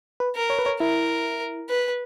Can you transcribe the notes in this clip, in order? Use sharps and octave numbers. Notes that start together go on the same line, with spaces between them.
B4
A#4
C#5
B4
C#5
E4 A#4
B4